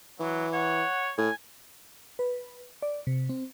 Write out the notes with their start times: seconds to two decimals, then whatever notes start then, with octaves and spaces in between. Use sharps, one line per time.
0.20 E3 F#3
0.53 C#5 F#5
1.18 A2 G#5
2.19 B4
2.82 D5
3.07 C3
3.29 C4